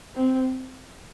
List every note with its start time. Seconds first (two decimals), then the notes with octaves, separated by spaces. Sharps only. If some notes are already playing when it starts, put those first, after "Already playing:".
0.15 C4